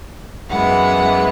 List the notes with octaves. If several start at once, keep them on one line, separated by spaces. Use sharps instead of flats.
F#2 E3 G#3 B3 F#5